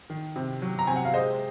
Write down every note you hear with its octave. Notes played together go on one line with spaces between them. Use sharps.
D#3
C3
F#3
A#5
C3 G#5
F#5
F5
G#3 C5 D#5